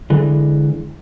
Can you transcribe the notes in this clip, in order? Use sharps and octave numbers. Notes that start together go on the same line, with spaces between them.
D3 E3 G#3